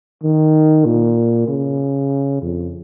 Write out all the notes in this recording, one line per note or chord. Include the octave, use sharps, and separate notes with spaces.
D#3
A#2
C#3
F2